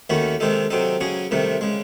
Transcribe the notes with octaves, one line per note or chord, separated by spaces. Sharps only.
D#2 D#3 A3 C#4 F#4
C3 D#3 G#3 D#4 A4
C3 F#3 C4 D#4 A4
C#3 F#3 C#4 G#4
C2 C3 D#3 A3
C#3 G#3